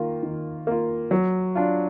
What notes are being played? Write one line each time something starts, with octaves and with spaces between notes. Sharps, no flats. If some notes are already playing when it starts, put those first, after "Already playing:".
Already playing: D#3 A#3 F4
D#3
A#3 F4
F#3
D4 F4